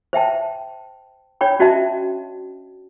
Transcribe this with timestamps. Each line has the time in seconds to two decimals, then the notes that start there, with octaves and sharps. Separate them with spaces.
0.13 C5 E5 G5 A5
1.41 D4 C#5 G5 B5
1.59 C#4 F#4 D#5 E5 A5